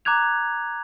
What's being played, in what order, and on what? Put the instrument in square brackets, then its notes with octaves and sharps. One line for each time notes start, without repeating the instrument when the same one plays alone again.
[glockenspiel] A#5 D6 F#6 G#6 F7